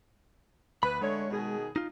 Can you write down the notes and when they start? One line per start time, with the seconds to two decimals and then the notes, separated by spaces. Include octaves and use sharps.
0.83 D2 B4 B5
1.01 D3 G#3 A3 C#5
1.30 B2 D#3 G#4
1.76 D#4 F4